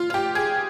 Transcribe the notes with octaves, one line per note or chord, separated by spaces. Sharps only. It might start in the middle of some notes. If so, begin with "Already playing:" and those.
Already playing: F4
F4
G4
G#4